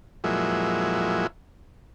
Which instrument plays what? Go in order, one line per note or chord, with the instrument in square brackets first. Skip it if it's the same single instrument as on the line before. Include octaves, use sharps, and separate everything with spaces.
[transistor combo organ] F2 A#2 F#3 G#3 E4